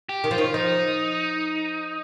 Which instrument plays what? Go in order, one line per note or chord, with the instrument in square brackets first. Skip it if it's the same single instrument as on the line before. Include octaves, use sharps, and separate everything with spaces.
[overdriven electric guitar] G4
[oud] D#3
[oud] F3 [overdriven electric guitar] F4
[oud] D#3
[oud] F3 [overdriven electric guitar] D#4